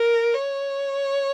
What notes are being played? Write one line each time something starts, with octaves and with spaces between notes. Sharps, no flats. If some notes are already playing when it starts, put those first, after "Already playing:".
Already playing: A#4
C#5